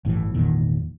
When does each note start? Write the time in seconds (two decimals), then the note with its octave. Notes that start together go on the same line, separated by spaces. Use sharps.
0.05 G1 A2 C3 E3
0.34 G#1 E2 A#2 D#3